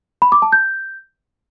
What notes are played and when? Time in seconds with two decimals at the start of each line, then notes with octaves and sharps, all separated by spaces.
0.22 B5
0.32 D6
0.42 A5
0.52 G6